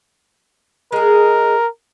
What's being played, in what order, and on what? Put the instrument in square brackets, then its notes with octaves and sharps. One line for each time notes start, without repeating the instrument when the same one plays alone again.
[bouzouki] G#3 G#4 [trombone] A#4